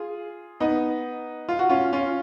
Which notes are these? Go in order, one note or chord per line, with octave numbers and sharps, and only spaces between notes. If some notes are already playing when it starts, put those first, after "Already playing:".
Already playing: F4 G#4
B3 D#4
F4
F#4
C#4 F4
C#4 F4